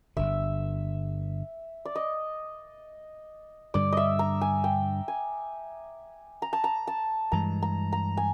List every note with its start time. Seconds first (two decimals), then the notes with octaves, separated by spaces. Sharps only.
0.16 G1 G2 D3 E5
1.85 D5
1.95 D#5
3.74 G2 D3 G3 D5
3.92 D#5 E5
4.19 A#5
4.41 G#5
4.64 G5
5.08 G#5
6.42 A#5
6.53 A5
6.64 A#5
6.87 A5
7.32 G2 E3 G#3 A#5
7.62 A#5
7.92 A#5
8.17 G#5